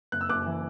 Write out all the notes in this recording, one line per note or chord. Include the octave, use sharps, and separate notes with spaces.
F#1 F#6
E6
F#1 D6 F#6
E3